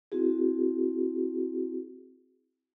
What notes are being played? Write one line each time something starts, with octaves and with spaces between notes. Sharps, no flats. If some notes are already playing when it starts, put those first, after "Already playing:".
C4 E4 F#4 G#4